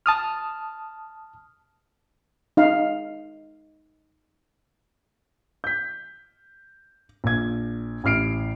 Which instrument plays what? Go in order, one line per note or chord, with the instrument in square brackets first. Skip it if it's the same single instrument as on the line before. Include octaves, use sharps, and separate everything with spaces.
[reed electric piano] A5 D#6 F6
[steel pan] D#4 F5
[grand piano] G6 B6
A#1 G#6
A1 E4 F6 C7 D7